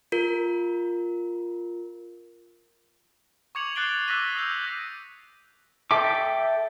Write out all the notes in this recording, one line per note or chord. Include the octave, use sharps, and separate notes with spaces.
F4 A#4
C#6 D6 G#6 C#7 F7 F#7
D6 F#6 A6 C7 D7 G7
D6 E6 F#6 A#6 B6 D#7
D#6 E6 G6
A4 E5 G5 D6